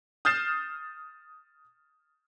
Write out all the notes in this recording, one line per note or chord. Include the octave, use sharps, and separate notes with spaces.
D#6 F6 G6 A6 C7 E7